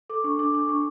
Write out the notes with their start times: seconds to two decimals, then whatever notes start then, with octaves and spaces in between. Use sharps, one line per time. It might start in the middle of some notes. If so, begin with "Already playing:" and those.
0.10 A4 D6
0.24 D4 C#6
0.39 D4 D6
0.54 D4 D6
0.69 D4 C#6